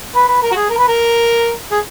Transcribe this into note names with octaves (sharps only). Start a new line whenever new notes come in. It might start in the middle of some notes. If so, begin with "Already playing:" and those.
B4
B4
A#4
F#4
G#4
A#4
B4
A#4
G#4